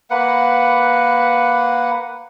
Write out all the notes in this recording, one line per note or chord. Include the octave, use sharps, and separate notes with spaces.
A#3 B4 F#5